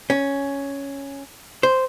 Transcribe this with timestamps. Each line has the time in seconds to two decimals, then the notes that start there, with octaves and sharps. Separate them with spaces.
0.10 C#4
1.63 C5